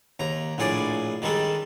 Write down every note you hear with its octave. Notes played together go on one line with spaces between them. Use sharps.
D#2 A#5
A#1 A2 G#4 D5
D#3 G3 G#3 A4